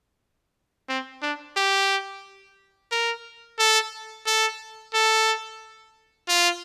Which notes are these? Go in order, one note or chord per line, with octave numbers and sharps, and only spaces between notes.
C4
D4
G4
A#4
A4
A4
A4
F4